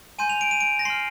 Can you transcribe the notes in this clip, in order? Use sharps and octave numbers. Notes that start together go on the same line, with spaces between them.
G#5 C6 G6 D#7
F7
D7
D#7
D7
A#6
C6 F6 C7